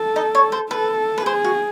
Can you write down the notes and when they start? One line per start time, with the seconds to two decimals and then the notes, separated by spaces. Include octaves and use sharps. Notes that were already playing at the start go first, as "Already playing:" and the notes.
Already playing: A4
0.16 D#4 D#5
0.35 C#5
0.52 C5
0.71 A4 B4
1.18 B4
1.26 G#4 C5
1.44 F#4